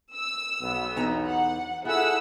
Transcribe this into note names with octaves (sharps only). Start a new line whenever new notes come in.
E6
B1 B3
E2 D#4 A#5
F#5
E4 F4 G#4 A4 F#5 E6